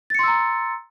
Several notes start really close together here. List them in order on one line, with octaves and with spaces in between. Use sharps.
A6 C#7 C6 E6 A#5